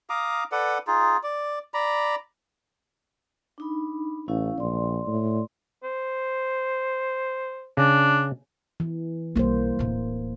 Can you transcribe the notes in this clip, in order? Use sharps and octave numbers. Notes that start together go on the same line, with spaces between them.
F5 A#5 D6 D#6
A4 B4 D5 F#5
D#4 F4 G#4
D5
D5 A#5 B5
D4 D#4 B5
A1 C#4 E4 F5
A#1 D5 C6
A2
C5
C#3 D4
E3
B1 G3 A#3 C5
D1 A2